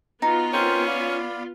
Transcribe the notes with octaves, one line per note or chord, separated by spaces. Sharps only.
B3 D#4 F4 F#4
C4 C#4 A#4 C5
D5 F5 B5